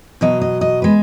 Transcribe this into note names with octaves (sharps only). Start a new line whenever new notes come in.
B2 F#3 D#5
D#5
D#5
G#3 B4